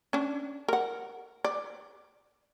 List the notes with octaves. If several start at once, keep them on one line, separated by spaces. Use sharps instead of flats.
C#4 D4
A#4 F#5
D5